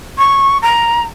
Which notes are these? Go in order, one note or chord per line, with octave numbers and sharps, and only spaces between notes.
C#6
A#5